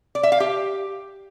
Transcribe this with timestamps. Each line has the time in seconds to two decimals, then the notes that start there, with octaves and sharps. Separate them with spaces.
0.15 D5
0.23 E5
0.32 F5
0.40 G4